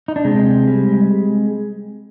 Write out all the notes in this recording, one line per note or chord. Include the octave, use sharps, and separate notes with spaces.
D#4
D4
C3 G#3 C4
G3